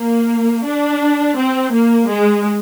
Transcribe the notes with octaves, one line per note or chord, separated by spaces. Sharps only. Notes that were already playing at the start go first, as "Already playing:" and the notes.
Already playing: A#3
D4
C4
A#3
G#3